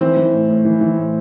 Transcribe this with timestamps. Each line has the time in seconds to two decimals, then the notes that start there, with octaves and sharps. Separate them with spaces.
0.01 E3 C4
0.17 E3
0.33 A2
0.49 A2
0.65 E3
0.81 E3
0.97 A2